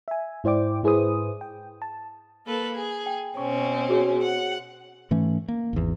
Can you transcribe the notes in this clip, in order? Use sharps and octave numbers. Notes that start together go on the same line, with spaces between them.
E5 G#5
G#2 E4 C5 D5 G5 D6
G#2 E4 G#4 B4 C5 D#6
G5
A5
A#3 A4 B4
G#4
G5
B2 C4 C#4 C#6
F#4 G#4 C#5
F#5
G#2 E3 A3 C#4
A#3
G#1 E2